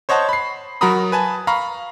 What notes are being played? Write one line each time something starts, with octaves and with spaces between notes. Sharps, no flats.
C5 C#5 D#5 F#5 A5
B5 C7
F#3 F#4 A#4 A#5 B5 D#6
B4 G#5 A5
F5 A#5 B5 C#6